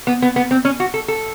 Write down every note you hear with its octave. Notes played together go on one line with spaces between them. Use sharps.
B3
B3
B3
C4
C#4
F#4
A4
A4